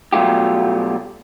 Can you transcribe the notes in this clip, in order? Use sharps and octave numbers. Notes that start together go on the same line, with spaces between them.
B2 F#3 G3 A3 F4 G4